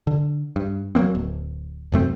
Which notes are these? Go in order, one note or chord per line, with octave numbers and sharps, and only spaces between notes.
D3
G2
F#3 G#3 A#3 C4
D1
F1 F#2 A3 C4